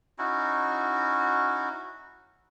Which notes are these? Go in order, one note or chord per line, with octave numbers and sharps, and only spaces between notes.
C#4 D#4 E4 F#4